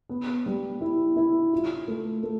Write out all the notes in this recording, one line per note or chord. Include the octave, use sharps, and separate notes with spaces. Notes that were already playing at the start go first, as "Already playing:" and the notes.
B3
G3
E4
E4
F4
A3
A3